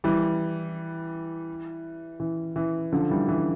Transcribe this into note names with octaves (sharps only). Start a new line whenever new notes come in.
E3 G3
E3
E3
D3 F3
E3 G3
E3